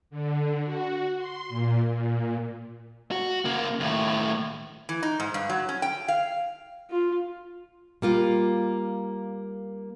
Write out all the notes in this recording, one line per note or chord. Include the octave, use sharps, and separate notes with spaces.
D3
F#4
C6
A#2
A#2
F#4
C#3 A#3
D#2 A2
E3
D#4
G#2
G2
F#3
C#4
G5
F5
F4
G3 A#3 F4